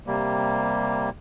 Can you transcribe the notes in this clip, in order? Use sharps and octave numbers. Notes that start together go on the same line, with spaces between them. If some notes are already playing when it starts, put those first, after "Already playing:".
C3 G3 A#3